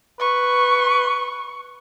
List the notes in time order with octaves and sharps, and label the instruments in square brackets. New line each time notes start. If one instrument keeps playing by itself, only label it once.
[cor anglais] B4 [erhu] C#6